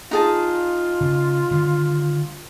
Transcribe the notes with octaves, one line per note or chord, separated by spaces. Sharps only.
D#4 F4 G#4 A5
C#3
D3 D#3 G3